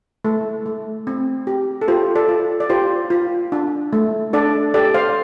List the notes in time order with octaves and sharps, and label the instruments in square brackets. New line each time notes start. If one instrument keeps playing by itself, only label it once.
[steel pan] A3 A4
A3
C4
G4
A4
F4 G4 C5
A4 D5
F4
D5
F4 G4 C5
F4
D4
A3
D4 A4 D5
G4 A4 D5
C5 F5